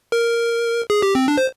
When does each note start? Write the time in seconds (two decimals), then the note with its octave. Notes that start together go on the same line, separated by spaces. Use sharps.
0.12 A#4
0.90 G#4
1.02 G4
1.15 C4
1.28 D4
1.38 C5